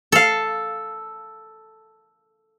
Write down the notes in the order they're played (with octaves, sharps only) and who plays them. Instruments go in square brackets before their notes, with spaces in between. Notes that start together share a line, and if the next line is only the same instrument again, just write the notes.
[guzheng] A4 F5